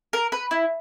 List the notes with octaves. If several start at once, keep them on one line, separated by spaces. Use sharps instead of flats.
A#4
B4
E4